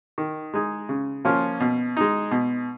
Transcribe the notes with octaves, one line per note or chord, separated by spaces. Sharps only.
D#3
G#3 D#4 G#4
C#3
F3 A#3 C#4 F4
B2
G#3 D#4
B2